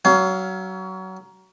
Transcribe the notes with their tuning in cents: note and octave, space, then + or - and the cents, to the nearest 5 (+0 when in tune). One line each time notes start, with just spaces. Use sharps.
F#3 +25 C#4 +25 F5 +0